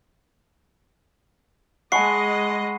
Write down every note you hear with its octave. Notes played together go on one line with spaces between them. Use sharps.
G#3 D#5 F#5 G#5 A5 B5 C#6 C7